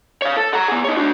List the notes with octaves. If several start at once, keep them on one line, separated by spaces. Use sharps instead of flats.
C#5 F5
A4
F#5 A#5
B3 G#4
D#4 C#5
D4 F#4